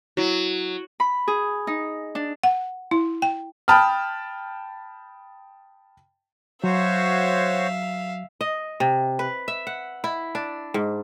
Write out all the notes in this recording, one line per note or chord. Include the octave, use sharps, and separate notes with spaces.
F#3 E4 F#4
B5
G#4
D#4
D4
F#5
E4
G5
G5 A5 B5 D#6 F6
F#3 F#4 C5 C#5 E5 F5
D#5
C3
B4
E5
F#5
E4
D4
G#2